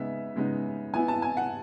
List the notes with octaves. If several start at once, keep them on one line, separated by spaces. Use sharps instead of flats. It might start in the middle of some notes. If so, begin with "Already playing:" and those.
Already playing: C#3 G#3 B3 D#4 E5
C#3 G#3 B3 D#4
E3 B3 E4 G#5
A5
G#5
F#5